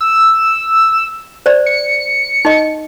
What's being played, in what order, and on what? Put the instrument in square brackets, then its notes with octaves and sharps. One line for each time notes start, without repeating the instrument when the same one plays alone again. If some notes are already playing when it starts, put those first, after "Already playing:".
[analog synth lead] E6
[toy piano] C5 D5
[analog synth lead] C#7
[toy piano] D#4 D#5